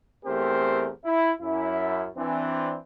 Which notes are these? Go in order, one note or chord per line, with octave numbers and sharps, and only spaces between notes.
E2 A3 C4 G4 A#4 C5
E4
F#2 E4
E3 C4 D4